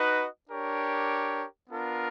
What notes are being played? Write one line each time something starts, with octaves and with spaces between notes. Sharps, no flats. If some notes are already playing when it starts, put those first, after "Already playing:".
Already playing: D#4 F#4 B4 D#5
D4 G4 A#4 C#5
B3 D4 F4 A#4